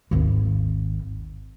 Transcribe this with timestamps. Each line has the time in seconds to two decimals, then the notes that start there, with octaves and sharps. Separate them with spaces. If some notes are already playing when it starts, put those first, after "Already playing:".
0.11 G#1 D#2